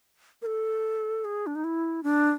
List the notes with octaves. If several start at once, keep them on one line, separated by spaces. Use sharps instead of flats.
A#4
A4
G#4
D4
D#4
E4
D4